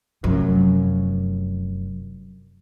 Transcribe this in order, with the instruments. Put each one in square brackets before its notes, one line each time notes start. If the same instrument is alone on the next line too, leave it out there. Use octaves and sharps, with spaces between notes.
[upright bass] F1 F#2